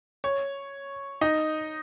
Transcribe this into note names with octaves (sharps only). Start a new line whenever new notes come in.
C#5
D#4 D#5